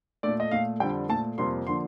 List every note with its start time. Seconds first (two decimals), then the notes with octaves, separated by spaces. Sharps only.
0.23 A#2 A3 D5
0.40 D#5
0.51 A#2 A3 F5
0.80 F2 D3 G3 G5
1.09 A#2 A3 A5
1.38 F2 C3 G3 A#3 C6
1.67 D3 F3 A#3 C6